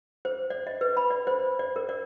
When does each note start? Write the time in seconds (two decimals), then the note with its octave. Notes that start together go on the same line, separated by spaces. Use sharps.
0.25 C5
0.50 D5
0.67 D#5
0.81 B4
0.97 B5
1.10 D5
1.27 C5
1.59 D5
1.76 A#4
1.89 D5